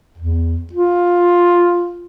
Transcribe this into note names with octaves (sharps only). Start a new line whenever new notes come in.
E2
F4